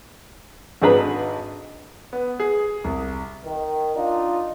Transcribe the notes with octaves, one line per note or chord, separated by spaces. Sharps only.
G#1 D4 G#4 B4 A#5
B3
G#4
C2
D#3
D4 D#4 F4